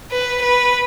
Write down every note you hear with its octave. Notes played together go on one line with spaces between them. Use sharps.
B4
B4